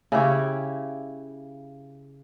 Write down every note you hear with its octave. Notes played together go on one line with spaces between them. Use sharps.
C#3 E4 G4 C#5